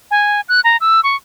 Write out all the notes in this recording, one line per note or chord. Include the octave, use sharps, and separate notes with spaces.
G#5
F#6
A#5
E6
C#6